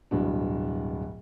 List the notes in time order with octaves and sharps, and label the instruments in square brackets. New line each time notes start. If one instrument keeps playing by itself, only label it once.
[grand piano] D1 G2 B2 D4